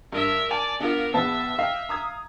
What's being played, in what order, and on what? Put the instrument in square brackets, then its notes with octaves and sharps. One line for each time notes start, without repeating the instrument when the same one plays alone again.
[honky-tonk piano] G2 [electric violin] A#4 E5
[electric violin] D5 [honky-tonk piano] G#5 A5 F7
[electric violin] B3 A#4 [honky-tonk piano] D4 F4
[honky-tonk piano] A#1 B4 F5 [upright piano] B3 A5 [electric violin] E5
[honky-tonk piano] D#5 G5 [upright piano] F5
[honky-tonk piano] A#5 D#6 G#6